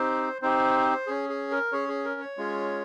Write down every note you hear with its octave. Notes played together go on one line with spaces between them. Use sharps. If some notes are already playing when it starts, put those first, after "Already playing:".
Already playing: C4 D#4 G4 C5
C4 D#4 G4 C5
C#4 G#4
G#4
A#4
C#4 G#4 C#5
G#4
A#4
C#5
G#3 C#4 F4 G#4